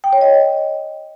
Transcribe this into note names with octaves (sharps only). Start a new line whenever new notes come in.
G5
C#5
D#5